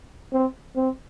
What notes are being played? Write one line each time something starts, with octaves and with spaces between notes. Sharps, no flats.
C4
C4